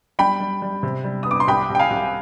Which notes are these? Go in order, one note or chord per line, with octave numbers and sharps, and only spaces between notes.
G3 G5 B5
G3
G3
C3
G3
B3 D#6
D6
C6
C2 G5 B5
C2
G5
F5 G#5
C2